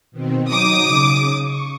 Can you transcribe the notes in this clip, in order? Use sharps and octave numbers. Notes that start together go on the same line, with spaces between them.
B2 D#3 C4
F#3 D#4 D6 D#6
C#3
C#6